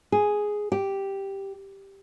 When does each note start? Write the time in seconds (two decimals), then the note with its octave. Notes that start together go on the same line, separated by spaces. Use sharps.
0.12 G#4
0.72 G4